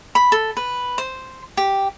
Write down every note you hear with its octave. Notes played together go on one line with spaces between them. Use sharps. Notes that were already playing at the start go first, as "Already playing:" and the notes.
B5
A4
B4
C5
G4